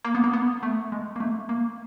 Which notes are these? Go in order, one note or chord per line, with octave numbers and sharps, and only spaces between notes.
A#3
B3
A#3
B3
A3
G#3
A#3
A3
A#3